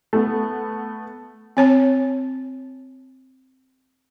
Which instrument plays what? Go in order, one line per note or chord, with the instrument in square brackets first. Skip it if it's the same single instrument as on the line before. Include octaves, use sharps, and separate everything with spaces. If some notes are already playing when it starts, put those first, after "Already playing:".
[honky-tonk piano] A3 B3
[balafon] C4 C#5 A5